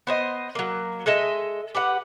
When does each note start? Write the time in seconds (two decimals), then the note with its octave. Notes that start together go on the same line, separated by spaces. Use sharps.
0.07 B3 C5 D#5
0.55 F#3 A#3
1.06 G#3 A4 D#5 E5
1.75 G4 B4 F#5